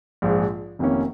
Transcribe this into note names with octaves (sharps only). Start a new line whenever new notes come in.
A#1 G#2 F3 G#3
F1 F2 D#3 A#3 C#4